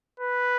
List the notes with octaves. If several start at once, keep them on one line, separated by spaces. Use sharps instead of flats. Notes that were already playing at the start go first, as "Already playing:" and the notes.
B4